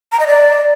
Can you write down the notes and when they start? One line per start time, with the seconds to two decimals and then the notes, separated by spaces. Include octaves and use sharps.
0.12 A#5
0.19 D#5
0.27 D5